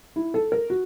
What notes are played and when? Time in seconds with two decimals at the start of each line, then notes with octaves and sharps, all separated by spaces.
0.16 E4
0.34 A4
0.52 A#4
0.70 F#4